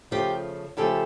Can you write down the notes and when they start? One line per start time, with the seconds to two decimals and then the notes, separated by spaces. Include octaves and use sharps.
0.11 C#3 F3 A3 F4 G4
0.77 C#3 F3 A3 G4 A4